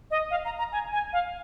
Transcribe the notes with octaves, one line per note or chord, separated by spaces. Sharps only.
D#5
F5
A#5
A#5
G#5
G#5
F5